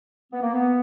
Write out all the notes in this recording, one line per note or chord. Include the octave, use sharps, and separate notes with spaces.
B3
A#3
B3